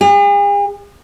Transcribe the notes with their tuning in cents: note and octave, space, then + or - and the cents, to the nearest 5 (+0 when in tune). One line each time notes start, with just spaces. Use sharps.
G#4 -45